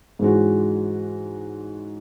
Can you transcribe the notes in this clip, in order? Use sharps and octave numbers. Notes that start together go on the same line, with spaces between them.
G#2 E3 G#3 C#4 F#4